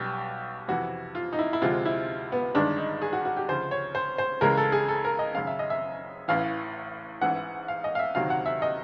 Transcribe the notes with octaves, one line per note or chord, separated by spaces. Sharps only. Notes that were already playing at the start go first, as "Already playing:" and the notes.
Already playing: B1 B2 G3 G4
F2 C3 E3 F#4
F4
D#4
E4
E4
D2 C3 F3 G#3 F4
E4
B3
G1 G2 D#3 G#3 D4
D#4
G#4
F#4
F#4
G4
D2 C#3 F3 C5
C#5
C5
C5
C#2 C#3 E3 G#3 A#4
A4
G#4
A4
A#4
D#5
G#1 F#2 C#3 F5
E5
D#5
E5
A1 A2 E3 F5
A1 G#2 E3 F#5
F5
D#5
F5
E5
D2 C3 D#3 F#3 F5
F#5
E5
D#5